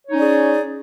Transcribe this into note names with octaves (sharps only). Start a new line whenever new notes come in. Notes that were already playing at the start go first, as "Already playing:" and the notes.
C#4 D#4 G#4 C#5 D5